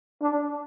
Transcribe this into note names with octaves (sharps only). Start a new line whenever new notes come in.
D4